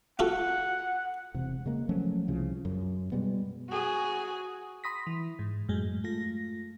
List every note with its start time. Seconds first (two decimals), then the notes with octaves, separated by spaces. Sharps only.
0.19 F4 F#4 A4 F#5
1.34 E1 C3
1.66 C#3 G#3 A#3
1.89 F3 F#3 A3 C#4
2.28 C2 C#3 F3
2.65 F#2
3.12 B2 G3 G#3 B3
3.69 F#4 G#4
4.84 B5 C6 D#6 A#6 B6
5.07 E3
5.39 G#2
5.69 F#2 A2 G#3
6.04 A3 F4 A#6